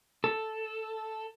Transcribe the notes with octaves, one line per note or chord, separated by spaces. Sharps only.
A4